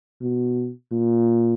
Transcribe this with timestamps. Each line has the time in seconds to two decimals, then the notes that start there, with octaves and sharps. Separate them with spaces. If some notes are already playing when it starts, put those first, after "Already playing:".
0.21 B2
0.92 A#2